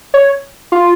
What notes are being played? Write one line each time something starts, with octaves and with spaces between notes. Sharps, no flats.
C#5
F4